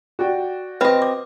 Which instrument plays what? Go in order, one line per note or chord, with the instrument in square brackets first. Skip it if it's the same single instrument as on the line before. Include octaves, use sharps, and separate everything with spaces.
[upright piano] F#4 D5 G5
[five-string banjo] C4 D#5 [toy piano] B4 B5
[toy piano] D6